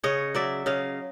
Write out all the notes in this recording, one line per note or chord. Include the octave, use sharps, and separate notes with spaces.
C#3 C#5 D#5
F#3 D5 E5
C#3 D#5 F5